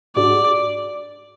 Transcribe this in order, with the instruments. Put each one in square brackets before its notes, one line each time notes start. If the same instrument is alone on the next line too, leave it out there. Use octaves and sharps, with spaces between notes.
[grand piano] G#2 G#3 D4 F#4 [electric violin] D5